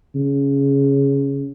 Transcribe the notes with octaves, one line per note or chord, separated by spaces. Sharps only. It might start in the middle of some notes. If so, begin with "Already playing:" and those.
C#3